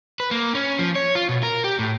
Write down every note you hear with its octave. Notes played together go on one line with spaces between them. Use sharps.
B4
A#3
C#4
F3
C#5
F4
B2
A#4
G4
A2